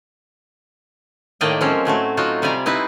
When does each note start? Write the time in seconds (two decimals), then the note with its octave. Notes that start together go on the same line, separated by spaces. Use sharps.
1.41 A2 D#3 A#3 D5 D#5 G5
1.61 F3 F#3 G#3 C4 C#4
1.85 A2 F#3 A3 F#4
2.17 F#3 D#4 F4 F#4
2.42 C3 G3 D5 G#5 A#5
2.66 C4 D#4 E4 B4